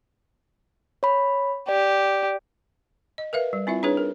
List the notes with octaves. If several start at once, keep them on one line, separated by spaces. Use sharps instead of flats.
C#5 B5
G4 D5
D#5
A#4 B4 E5 F5
G3
C4 E4 F4 E5
D4 D#4 G#4 B4 C#5
A#4